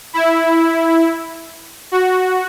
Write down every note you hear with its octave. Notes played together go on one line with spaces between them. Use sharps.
E4
F#4